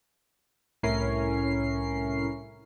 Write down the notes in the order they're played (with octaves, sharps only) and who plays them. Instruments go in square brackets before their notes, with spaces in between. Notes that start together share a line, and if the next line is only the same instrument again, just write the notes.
[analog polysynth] C2 A2 C#4 E4 A#4 C7